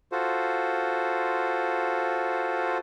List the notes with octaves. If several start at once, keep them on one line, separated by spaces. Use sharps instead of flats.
F4 F#4 A4 C5